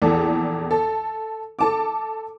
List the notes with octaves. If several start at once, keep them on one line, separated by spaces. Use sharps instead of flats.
A#1 E2 E3 A4
A4
A4 A5 D6